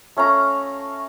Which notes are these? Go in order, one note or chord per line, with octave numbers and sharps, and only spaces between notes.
A3 C#4 F5 A#5